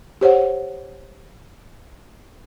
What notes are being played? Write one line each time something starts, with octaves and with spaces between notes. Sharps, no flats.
G4 C5 C#5 F#5